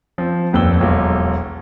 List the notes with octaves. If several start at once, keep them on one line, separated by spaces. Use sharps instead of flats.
F3 C4
D#1 F2 B4 E6 G7
E1 B1 G#6